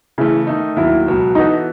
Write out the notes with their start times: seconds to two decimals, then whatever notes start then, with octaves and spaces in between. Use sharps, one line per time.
0.18 C#3 E3 A3 E4 G#4
0.47 D#3 A3 D#4
0.76 D#2 D#3 F#3 E4
1.07 C#2 B2 F#3
1.35 E3 B3 D#4 F#4 A4